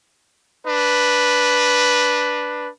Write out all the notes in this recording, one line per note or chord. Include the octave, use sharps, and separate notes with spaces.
D4 B4